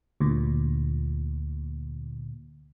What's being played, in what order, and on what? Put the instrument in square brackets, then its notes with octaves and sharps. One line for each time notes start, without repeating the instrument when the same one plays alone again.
[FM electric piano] D2 A#2